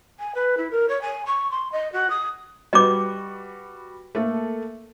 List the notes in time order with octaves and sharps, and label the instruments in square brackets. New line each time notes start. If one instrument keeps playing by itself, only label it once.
[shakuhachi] G#5
B4
E4
A#4
C#5
G#5
C#6
C6
D#5
F#4
D#6
[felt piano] G3 F#4 B4 [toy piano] D#5 D6
[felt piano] A3 A#3 A4